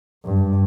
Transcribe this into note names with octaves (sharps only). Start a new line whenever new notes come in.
G2